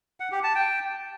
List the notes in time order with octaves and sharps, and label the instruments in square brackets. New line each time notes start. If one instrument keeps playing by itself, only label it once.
[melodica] F#5
G4
A5
G5